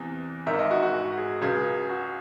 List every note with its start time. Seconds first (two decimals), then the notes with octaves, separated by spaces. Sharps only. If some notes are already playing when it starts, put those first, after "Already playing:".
Already playing: E2 C3 E3
0.46 G#1 G#2 D#3 E5
0.59 D#5
0.71 F#4
0.83 F#4
0.94 F#4
1.17 G#4
1.41 C#2 C#3 F#3 G#4
1.90 F#4